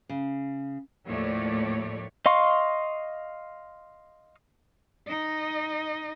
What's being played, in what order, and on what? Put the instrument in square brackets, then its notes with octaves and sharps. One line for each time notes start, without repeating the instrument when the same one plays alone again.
[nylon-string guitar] C#3
[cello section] D#2 A2 F3 A3 C#5 D5
[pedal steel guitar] D#5 F5 C6 C#6
[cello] D#4 D#5